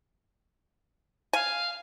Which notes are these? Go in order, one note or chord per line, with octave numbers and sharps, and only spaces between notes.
F5 G#5